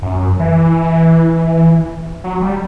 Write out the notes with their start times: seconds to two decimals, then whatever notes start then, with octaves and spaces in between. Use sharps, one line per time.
0.02 F#2
0.40 E3
2.24 F#3
2.42 G3